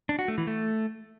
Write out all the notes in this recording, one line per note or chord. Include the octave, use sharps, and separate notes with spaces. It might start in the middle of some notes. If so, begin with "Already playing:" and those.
D4
F#4
A3
E3
A3